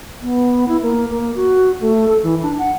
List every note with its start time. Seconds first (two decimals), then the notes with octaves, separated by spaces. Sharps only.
0.22 B3
0.68 E4
0.82 A#3
1.10 A#3
1.36 F#4
1.81 A3
2.08 A4
2.23 E3
2.42 D4
2.59 F#5